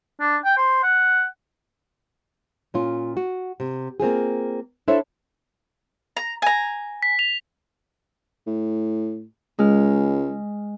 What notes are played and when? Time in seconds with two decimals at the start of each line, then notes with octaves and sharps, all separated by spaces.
0.21 D4
0.45 G5
0.57 C5
0.84 F#5
2.74 A#2 C#4 F4
3.17 F#4
3.60 C3
4.00 A#3 C4 F4 G#4
4.88 D4 E4 A4 C5 C#5 E5
6.17 A#5
6.42 G#5 A#5
7.03 B6
7.19 F7
8.47 A2
9.59 C#2 G#3 F6